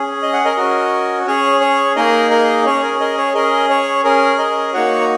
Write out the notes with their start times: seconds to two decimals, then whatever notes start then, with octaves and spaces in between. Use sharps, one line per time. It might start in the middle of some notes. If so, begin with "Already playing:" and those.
Already playing: C#4 G#4
0.22 D#5
0.33 F#5
0.45 A#4 D#5
0.57 C#4 F#4
1.27 C#4 G#4 C#5
1.61 C#5
1.96 A#3 D#4 G#4 A#4 D#5
2.30 A#4 D#5
2.66 C#4 G#4 C#5
2.83 A#4
3.00 A#4 D#5
3.17 C#5
3.34 C#4 G#4 A#4 D#5
3.70 C#5
4.04 C#4 G#4 A#4
4.38 A#4 D#5
4.73 A#3 D#4 F#4 C#5 F#5
5.01 A#5